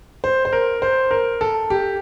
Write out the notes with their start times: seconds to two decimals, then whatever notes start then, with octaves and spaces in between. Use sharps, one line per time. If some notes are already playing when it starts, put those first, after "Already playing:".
0.24 C5
0.45 C5
0.52 A#4
0.82 C5
1.11 A#4
1.41 A4
1.70 G4